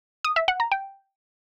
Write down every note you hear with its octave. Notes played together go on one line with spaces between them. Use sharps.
D#6
E5
F#5
A#5
G5